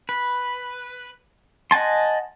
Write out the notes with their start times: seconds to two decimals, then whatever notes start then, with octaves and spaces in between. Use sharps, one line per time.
0.09 B4
1.71 D#5 F#5 G#5 A5 C6